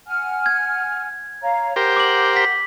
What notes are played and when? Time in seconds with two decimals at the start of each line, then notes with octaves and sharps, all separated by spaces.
0.07 F#5 G#5 F6
0.46 G#6
1.42 C#5 F5 A#5
1.76 G4 A#4 C5 F#5
1.96 D6 F#7
2.36 B6